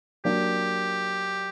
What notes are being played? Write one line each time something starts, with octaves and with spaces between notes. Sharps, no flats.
F#3 A#3 D4 G4